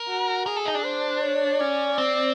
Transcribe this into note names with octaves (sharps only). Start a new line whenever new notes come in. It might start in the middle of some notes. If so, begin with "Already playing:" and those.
Already playing: A#4
F#4
G#4 A#4
A4
D#4
D4
C5
C#5
C#4 D5
C4